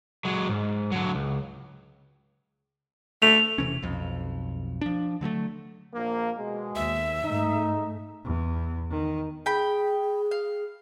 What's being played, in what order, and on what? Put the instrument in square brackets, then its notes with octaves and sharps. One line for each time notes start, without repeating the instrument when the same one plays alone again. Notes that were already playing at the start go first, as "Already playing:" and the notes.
[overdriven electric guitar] F#3 G#3
G#2
D3 F#3
C#2
[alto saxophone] A3 [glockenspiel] F7
[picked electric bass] E1 C3 E3 C#4
B1 F2
F3 D4
D3 F#3 G3 A3
[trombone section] A#1 A#3
B2 G#3
[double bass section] D#2 [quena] E5
[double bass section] G#2 A3 [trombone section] D#4
[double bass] E2
D#3
[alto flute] G#4 [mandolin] G5 B5
[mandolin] F5